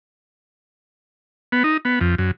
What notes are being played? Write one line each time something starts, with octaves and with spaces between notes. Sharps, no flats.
B3
D#4
B3
F2
F#2